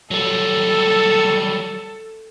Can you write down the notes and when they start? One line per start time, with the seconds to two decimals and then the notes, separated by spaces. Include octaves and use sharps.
0.11 F#3 G3 A4